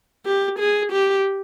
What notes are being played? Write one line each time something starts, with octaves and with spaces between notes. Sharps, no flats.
G4
G#4
G4